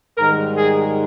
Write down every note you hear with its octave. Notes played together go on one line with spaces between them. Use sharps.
G#2 D#3 G3 A#4
G#4